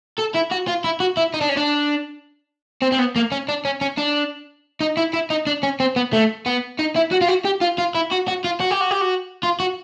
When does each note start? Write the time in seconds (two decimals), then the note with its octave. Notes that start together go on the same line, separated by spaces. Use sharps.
0.18 A4
0.34 E4
0.51 F#4
0.67 F4
0.84 E4
1.00 F#4
1.17 E4
1.34 D#4
1.41 D4
1.49 C#4
1.57 D4
2.82 C4
2.92 C4
2.99 B3
3.16 A#3
3.32 C#4
3.48 D4
3.65 C#4
3.81 C#4
3.98 D4
4.80 D#4
4.97 E4
5.14 E4
5.30 D#4
5.47 D4
5.63 C#4
5.80 C4
5.96 B3
6.13 A3
6.46 B3
6.79 D#4
6.96 E4
7.11 F#4
7.21 F4
7.28 F#4
7.45 G4
7.62 F4
7.78 F4
7.95 E4
8.11 F#4
8.28 F#4
8.44 F4
8.60 F#4
8.71 G4
8.81 F#4
8.91 G4
9.01 F#4
9.43 F4
9.60 F#4